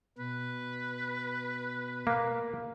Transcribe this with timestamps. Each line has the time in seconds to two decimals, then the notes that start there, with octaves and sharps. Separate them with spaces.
0.19 B2 B4
2.07 A#3